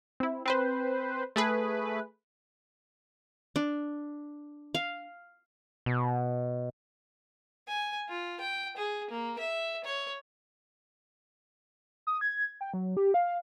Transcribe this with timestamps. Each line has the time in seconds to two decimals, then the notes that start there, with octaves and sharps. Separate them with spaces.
0.20 C4 E4
0.46 C4 B4 C5
1.36 A3 G#4 B4
3.56 D4
4.75 F5
5.86 B2
7.67 G#5
8.09 F4
8.40 G5
8.77 G#4
9.10 A#3
9.39 E5
9.84 C#5
12.07 D#6
12.21 G#6
12.61 G5
12.74 F#3
12.97 G4
13.14 F5